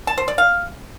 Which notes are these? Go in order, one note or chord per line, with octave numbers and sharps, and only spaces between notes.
A5
C5
D5
F5